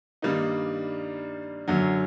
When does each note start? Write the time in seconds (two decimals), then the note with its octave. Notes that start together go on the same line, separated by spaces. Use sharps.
0.22 G2 D#3 G3 A#3 D#4
1.68 F#2 D3 F#3